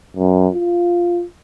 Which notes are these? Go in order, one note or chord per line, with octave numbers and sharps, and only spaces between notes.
F#2
F4